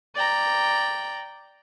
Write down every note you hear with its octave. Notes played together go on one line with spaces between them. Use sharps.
D5 G5 A#5